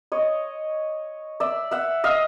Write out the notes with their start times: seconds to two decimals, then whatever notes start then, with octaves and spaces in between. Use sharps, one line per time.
0.12 C#5 D#5
1.40 D5 E5
1.71 E5 F#5
2.04 D#5 F5